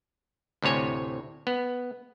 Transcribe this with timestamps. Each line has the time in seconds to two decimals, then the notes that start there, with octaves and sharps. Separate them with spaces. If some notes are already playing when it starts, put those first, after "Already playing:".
0.62 D2 A2 C3 C#5 G#5
1.47 B3